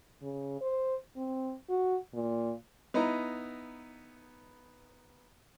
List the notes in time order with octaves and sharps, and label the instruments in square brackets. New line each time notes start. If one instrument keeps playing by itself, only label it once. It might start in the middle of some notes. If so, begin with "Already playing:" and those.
[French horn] C#3
C5
C4
F#4
A#2
[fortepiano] B3 D#4 E4 A#5